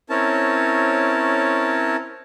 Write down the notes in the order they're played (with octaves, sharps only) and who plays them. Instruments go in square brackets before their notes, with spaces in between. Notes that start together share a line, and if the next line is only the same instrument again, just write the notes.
[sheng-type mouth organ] C4 C#4 E4 A#4 C#5 A5